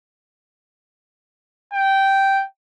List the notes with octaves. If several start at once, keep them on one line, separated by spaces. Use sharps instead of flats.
G5